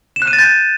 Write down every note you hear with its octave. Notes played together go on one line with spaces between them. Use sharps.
E7
F#6
D#7
A6
G6